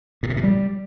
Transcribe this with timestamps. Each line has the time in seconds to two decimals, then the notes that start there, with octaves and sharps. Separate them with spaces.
0.23 A2
0.30 C3
0.37 A#2
0.43 G3